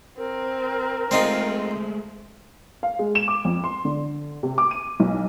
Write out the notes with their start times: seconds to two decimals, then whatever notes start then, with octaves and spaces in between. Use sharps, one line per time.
0.18 C4 A#4
1.11 G#3 A3 C4 D#4 F4 G#4 C5
2.83 F5
2.99 G#3
3.15 E7
3.28 D6
3.45 F2
3.64 C6
3.85 D3
4.43 C3
4.58 D6
4.71 D#7
5.00 B1